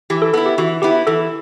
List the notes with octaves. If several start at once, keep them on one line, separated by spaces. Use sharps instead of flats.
E3 G4
A4
B3 E4 A4
G4
E3 F#4
B3 E4 G4
E3 A4